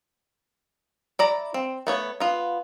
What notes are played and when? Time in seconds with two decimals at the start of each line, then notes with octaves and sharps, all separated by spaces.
1.19 E4 D5 A#5
1.54 C4
1.87 A3 B3 C#5
2.20 B3 F4